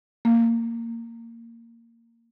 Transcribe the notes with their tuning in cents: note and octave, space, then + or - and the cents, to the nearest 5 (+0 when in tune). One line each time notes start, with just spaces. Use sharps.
A#3 -15